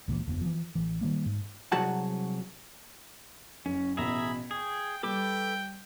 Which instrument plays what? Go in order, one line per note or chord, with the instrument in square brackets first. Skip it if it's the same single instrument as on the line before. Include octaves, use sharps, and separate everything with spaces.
[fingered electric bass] C#2 A#2 D3 E3
F#1 F2 B3
E3 F3
A1 E3
D#3 G3 A#3
G#2
[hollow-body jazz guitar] C2 F#3 F#4 G#4 F#5 A5
[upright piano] F#1 [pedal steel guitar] C#4
[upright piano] A1 B2 B6 [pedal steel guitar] G#4 E5 A#5 [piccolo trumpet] B5
[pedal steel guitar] G#4 [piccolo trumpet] G5 [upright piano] C#6
[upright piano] G3 [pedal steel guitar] A4 B4 D6 [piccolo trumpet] G5